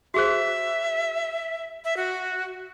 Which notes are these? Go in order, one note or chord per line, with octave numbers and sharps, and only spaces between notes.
F#4 G#4 C5 E5
E5
F#4